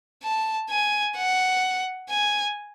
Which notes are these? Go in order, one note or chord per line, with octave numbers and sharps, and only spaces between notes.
A5
G#5
F#5
G#5